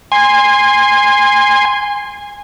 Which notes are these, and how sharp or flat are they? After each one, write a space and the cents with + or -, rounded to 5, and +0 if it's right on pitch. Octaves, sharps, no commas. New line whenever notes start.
G#5 -20 C6 +0